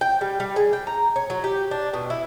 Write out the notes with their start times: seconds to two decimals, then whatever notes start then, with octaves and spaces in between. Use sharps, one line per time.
0.01 G5
0.21 G3
0.40 G3
0.56 G#4
0.73 G5
0.87 A#5
1.16 C#5
1.30 F#3
1.44 G4
1.71 D4
1.94 B2
2.10 E4